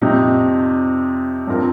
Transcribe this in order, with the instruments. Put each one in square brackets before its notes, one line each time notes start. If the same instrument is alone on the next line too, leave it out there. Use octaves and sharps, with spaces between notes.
[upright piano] F2 C3 G3 C4 D#4
G2 F3 C4 F4 A#4